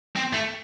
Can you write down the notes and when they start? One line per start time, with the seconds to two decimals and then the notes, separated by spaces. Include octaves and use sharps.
0.16 C4
0.33 A3